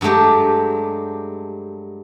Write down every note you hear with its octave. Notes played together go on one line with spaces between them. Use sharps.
G2 F#3 G#3 A3 G4